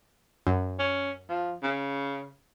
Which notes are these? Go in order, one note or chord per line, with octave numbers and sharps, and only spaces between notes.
F#2
C#4
F3
C#3